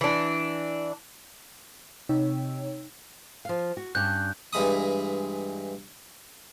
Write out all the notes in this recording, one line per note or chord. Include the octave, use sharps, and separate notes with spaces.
E3 D4
C3 D#4 C#5 G5 E6
F3 F5
F#4
G2 C#4 D4 F#6 G6
G2 E3 G#3 B5 D#6